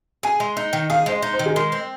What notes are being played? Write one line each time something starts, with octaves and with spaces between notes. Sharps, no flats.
G#4 G#5
G#3
D#4
D#3
G#4 F5
G#3 C5
D#5
D#4
C5
D#3
G#4
G#3 A#4
C4